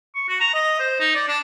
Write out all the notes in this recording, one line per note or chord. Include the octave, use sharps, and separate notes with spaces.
C#6
F#4
A#5
D#5
C5
D#4
D5
D4